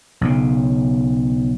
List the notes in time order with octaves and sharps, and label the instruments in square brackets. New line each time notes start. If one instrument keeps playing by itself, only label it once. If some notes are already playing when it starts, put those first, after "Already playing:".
[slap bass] B1 C#3